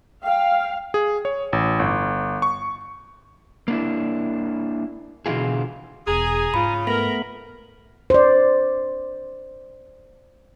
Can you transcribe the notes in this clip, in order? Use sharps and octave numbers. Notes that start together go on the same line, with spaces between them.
F5 G5
G#4
C#5
A1
G1
C#6
A#3 D4 E4
B2 D3 E3 E4 F4 G#4
E1 G#4 A#5 D#6
G#2 C#3 F4 B5
A3 B3 A#4 B5 B6
C5 D5